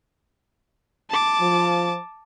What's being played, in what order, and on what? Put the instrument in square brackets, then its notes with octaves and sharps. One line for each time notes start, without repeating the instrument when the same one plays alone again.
[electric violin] A5 D6
[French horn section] F3